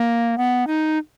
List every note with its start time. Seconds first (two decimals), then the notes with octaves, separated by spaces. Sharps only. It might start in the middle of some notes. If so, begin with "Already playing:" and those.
Already playing: A#3
0.38 B3
0.67 D#4